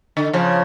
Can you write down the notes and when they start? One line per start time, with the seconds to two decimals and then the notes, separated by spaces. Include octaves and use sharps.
0.17 D3
0.33 C#3 F3